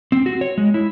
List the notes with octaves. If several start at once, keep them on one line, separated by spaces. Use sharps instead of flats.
C4
F#4
C#5
G#3
E4